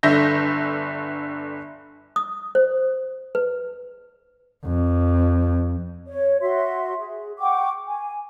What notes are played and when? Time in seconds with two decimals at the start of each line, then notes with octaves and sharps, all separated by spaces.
0.03 G1 D3 E5 G6 A#6
2.16 D#6
2.55 C5
3.35 B4
4.66 F2
6.07 C#5
6.41 F#4 E5 C6
6.99 G#4
7.40 F#5 G5 C#6 D6
7.87 G#5